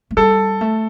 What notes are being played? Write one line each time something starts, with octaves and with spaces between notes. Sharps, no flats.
A3
G3 A4
A3